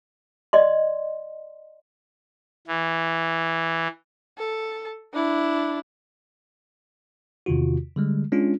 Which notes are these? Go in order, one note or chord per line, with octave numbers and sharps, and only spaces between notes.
D5 D#5 C6
E3
A4
D4 E4
E2 C3 D#3 F4 F#4
D3 G3 G#3
G#3 C#4 D4 F4